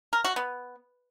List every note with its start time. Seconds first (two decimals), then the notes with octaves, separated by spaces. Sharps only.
0.13 A#4
0.24 F#4
0.36 B3